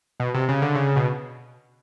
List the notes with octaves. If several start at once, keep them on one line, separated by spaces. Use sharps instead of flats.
B2
C3
C#3
D3
C#3
B2